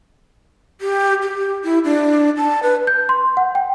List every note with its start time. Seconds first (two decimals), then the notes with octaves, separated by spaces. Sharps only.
0.81 G4
1.23 G4
1.64 E4
1.85 D4
2.37 A5
2.63 B4
2.87 G6
3.09 C6
3.37 F#5
3.55 G5